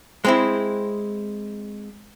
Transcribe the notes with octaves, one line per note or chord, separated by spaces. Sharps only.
G#3 C4 E4